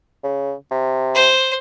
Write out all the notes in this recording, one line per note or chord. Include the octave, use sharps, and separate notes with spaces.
C#3
C3
C5